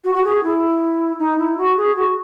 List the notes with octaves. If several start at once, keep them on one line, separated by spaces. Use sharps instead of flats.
F#4
F#4
G#4
E4
D#4
E4
F#4
G#4
F#4